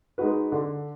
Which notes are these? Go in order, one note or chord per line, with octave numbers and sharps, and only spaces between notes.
G#3 D#4 F#4 B4
D3